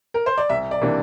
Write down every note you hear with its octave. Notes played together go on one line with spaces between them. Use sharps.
A#4
C5
D5
C2 E5
D5
C3 E3 A#3 D4